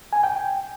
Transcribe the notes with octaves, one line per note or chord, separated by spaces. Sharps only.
G#5
G5